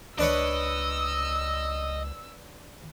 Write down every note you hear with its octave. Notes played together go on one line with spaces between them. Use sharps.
C#2 D4 B4 C#5 D#5 E6